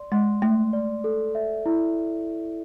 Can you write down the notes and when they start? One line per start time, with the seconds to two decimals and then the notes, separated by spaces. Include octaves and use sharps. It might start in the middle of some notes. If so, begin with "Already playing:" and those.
Already playing: D5 C6
0.12 G#3 C6
0.42 A3 C6
0.73 D5
1.04 A4
1.35 E5
1.66 E4